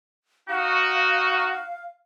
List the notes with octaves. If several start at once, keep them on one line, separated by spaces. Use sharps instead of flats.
D#4 F#4 F5